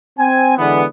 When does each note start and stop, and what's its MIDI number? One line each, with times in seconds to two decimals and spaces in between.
0.19 0.55 60
0.19 0.55 80
0.58 0.84 50
0.58 0.84 52
0.58 0.84 56
0.58 0.84 59